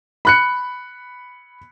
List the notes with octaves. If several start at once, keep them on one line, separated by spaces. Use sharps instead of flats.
B5 F#6 C#7